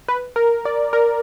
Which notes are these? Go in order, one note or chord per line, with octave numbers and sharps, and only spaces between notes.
B4
A#4
D5
A#4